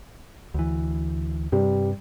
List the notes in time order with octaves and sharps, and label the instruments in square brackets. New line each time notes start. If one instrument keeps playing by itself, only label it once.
[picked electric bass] D2 E3
[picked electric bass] G2 C3 [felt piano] G3